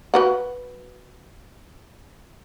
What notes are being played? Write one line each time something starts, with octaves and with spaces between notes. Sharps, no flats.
F#4 B4 F#5